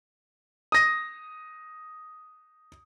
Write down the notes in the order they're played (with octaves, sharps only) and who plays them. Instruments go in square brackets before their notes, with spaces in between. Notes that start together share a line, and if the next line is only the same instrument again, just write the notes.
[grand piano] D#6 A#6